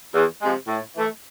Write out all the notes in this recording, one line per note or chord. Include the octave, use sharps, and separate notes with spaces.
E2
C3 F3 G#3
A2
E3 A3